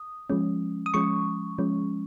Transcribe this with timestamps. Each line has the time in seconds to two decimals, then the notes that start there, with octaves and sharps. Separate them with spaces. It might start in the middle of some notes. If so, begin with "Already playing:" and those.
Already playing: D#6
0.30 F3 G#3 C#4
0.86 D#6
0.94 F3 G#3 C#4 C#6
1.59 F3 G#3 C#4